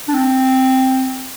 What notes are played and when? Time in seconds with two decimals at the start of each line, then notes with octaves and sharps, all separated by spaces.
0.08 D4
0.14 C4